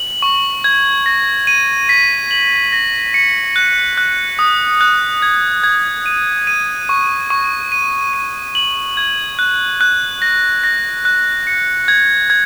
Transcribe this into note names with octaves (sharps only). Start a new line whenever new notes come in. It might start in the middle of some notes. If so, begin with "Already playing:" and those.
Already playing: F#7
C#6
G#6
A#6
D#7
B6
F#7
A#6
C#7
F#6
F#6
D#6
F#6
G#6
G#6
D#7
D#7
C#6
C#6
D#7
D#7
F#7
G#6
F#6
F#6
A#6
A#6
F#6
C#7
G#6
G#6